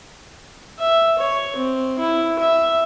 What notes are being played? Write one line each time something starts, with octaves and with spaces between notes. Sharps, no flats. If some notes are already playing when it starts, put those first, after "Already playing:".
E5
C#5
C4
E4
E5